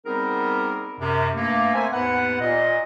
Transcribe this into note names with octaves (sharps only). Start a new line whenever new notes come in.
G3 B3 C4 D#4 G#4 A#4
F#2 C3
G2 A3 A#3
A3 C4 A#4 C5 E5 G#5
D#2 G#2 B3 B4 F#5
A#2 D#5